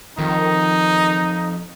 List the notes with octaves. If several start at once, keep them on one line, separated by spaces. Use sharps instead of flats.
F2 D#3 D#4